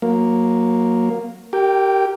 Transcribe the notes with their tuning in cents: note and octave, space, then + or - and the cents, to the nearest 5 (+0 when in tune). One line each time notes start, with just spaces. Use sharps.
F#3 -20 A#3 +0
G4 -20 A#4 -15 G5 +15